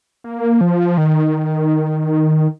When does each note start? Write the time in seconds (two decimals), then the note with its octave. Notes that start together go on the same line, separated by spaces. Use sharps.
0.24 A#3
0.61 F3
0.98 D#3